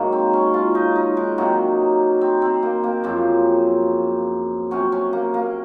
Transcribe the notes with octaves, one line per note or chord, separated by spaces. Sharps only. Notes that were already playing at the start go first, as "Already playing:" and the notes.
Already playing: G#2 D#3 F#3 A#3
C4
C#4
F4
D#4
D#4
G#3
C3 D#3 F#3 A#3
C4
C4
A#3
A#3
F#2 C#3 F3 C4
C3 F#3 C#4
C#4
A#3
A#3